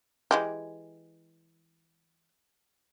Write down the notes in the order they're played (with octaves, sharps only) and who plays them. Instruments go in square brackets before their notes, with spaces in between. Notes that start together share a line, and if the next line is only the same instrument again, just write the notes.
[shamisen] E3 G#3 G4